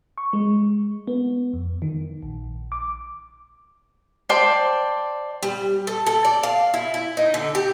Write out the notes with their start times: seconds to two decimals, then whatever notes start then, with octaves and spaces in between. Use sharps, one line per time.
0.18 C#6
0.33 G#3
1.07 B3
1.53 F2
1.82 D#3
2.22 A#1
2.72 D6
4.29 C5 D5 G5 A5
5.43 G3
5.87 A4
6.06 A4
6.25 D5
6.43 F5
6.74 E4
6.94 E4
7.17 D#4
7.34 D3
7.55 G4